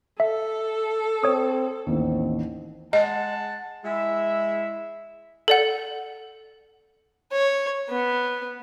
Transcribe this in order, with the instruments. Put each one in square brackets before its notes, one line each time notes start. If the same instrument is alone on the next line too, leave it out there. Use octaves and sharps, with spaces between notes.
[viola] A4 [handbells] E5
[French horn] C4 [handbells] C#5 D#6
[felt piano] A1 D#2 [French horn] C4
[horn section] G#3 F#5 A5 [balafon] D#5
[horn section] G#3 E4 E5
[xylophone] A4 D5 F#5
[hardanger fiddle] C#5
B3